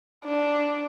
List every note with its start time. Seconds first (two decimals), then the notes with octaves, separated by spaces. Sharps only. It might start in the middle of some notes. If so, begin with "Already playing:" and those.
0.25 D4